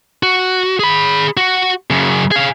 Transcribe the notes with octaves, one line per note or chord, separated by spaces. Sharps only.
F#4
G#4 B5
F#4
F#2 C#3
G#4 F5